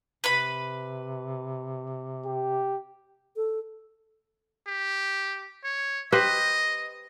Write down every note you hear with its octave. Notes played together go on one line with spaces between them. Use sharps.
C3 B4 B5
G4
A4
G4
C#5
G4 B4 C5 D#5